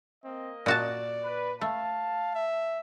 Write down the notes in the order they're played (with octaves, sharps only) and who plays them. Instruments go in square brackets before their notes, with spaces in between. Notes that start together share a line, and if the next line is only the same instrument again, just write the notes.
[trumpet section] A#3 A#4 D#5 [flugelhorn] C4
[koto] A#2 F#4 A5 [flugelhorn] D5
[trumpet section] B4
[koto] A3 [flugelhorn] F5 [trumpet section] A5
[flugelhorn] E5